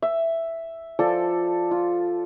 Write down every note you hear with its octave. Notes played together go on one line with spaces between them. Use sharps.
E5
F3 A4 D5
F4